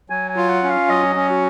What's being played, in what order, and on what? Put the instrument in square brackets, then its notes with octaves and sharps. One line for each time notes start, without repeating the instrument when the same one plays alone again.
[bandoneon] F#3 [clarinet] G#5
[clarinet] G#5
[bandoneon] F4
[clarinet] F#5
[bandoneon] C#4
[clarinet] F5
[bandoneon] F#3 [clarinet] D#5
[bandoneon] C#4
[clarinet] F#4